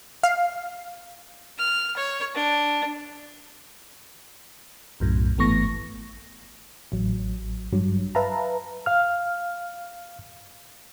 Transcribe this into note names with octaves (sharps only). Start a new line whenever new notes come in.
F5
F6
C#5
D4
B1 F#2 A2
G#1 E3 A3 B3 C#6 A#6
A1 F#3
G2 F#3
B4 E5 F5 A5 A#5
F5 F6